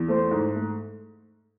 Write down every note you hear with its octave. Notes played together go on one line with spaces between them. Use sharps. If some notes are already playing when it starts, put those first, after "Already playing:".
Already playing: E2
A3 C5
G#2
A3